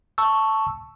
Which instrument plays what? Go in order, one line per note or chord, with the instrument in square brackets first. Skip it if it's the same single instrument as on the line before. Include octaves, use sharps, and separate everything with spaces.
[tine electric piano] A5 C#6 E6